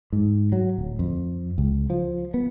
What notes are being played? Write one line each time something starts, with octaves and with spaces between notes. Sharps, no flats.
G#2
F#3
D1
F2
C#2
F3
B3